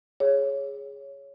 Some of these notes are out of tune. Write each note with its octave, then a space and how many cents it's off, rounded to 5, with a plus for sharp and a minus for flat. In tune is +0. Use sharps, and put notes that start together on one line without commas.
G#4 +0 C#5 +0